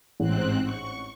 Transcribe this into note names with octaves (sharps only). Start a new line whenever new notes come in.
A1 G#2 C4 F#6
C#6